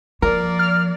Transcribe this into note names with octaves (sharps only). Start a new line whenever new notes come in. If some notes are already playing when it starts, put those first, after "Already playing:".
F3 A#3 A#4 D5
F6